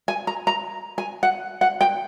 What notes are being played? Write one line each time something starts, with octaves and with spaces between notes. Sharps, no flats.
G#5
A#5
A#5
G#5
F#5
F#5
G5